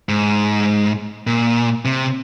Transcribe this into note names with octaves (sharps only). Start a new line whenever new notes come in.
G#2
A#2
C3